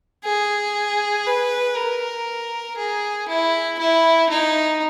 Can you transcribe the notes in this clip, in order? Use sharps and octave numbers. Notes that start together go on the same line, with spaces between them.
G#4
B4
A#4
G#4
E4
E4
D#4